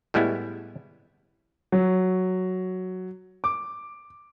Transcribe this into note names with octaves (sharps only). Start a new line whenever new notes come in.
A2 G3 G#3 B3 E4
F#3
D6